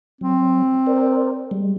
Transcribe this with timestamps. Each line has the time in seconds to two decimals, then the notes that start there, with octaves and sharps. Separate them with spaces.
0.21 F#3 C4
0.87 A#4 C5 D5
1.51 G3 G#3